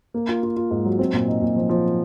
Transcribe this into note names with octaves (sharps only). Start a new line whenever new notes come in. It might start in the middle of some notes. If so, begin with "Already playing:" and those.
A#3
F4
F4
F4
G#2
F#3
C4
A#2
D#4
A#2
F3
F3